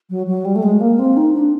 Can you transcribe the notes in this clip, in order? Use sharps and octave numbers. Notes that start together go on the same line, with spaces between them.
F#3
F#3
G3
A3
G#3
A#3
C4
D#4
D4